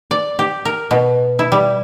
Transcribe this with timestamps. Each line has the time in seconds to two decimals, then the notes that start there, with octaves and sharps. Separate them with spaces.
0.11 D5
0.39 G4
0.65 A#4
0.91 B2
1.39 E4
1.52 G3